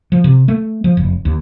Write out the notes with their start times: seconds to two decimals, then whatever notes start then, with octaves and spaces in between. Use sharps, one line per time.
0.12 F3
0.24 C3
0.48 A3
0.84 F3
0.97 F1
1.25 D#2